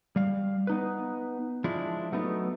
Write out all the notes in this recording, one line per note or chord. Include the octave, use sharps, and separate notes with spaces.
G3 F5
B3 D#4 B4
F3 G#3 D4 E4
F#3 A3 B3 D#4